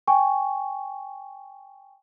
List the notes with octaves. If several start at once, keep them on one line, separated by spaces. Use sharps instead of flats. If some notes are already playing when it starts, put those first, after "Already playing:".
G5 G#5 C#6